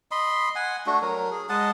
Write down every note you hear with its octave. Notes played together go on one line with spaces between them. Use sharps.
D#5 B5 C6
F#5 G#5
A3 D4 F#4
F#3 A#4
G#4
G#3 D#5 F#5 A5